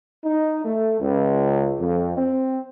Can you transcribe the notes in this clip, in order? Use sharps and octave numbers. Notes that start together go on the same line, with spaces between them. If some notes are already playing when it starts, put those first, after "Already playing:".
D#4
A3
C#2
F2
C4